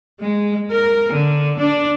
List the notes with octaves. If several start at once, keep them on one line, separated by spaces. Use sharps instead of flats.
G#3
A#4
D3
D4